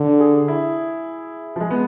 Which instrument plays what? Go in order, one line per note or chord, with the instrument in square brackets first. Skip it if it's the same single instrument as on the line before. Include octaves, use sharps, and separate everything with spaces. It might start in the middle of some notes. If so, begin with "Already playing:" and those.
Already playing: [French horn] D3
[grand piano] G#4
E4
F3
G#3
B3